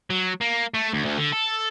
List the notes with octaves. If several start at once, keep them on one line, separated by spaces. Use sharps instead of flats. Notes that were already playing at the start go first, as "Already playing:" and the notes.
F#3
A#3
A3
D2
D2
D3
A4